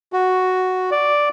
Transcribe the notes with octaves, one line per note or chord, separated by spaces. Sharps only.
F#4
D5